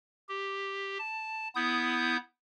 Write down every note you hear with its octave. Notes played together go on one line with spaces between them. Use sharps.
G4
A5
B3 E4 D#6 G6